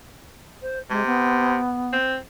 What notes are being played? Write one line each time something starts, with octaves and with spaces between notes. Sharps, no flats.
C5
C3 G#3
B3
C4